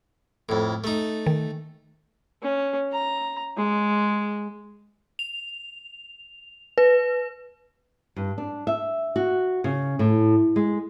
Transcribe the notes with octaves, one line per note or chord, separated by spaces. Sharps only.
F2 A2
A3 D#4
D#3
C#4
A#5
G#3
F7
B4
G2
D4
E5
F#4
C#3
A2
G#3